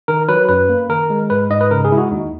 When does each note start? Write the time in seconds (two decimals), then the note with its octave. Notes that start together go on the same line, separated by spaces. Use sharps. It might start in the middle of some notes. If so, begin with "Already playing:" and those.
0.08 D#3 A#4
0.29 F#3 B4
0.49 F#2 B4
0.69 A#3
0.89 D#3 A#4
1.10 G#3
1.30 G#2 B4
1.50 G#2 D#5
1.61 B4
1.71 C#3 A#4
1.85 G#4
1.91 G#3 E4
1.98 F#4
2.11 D#2 D#4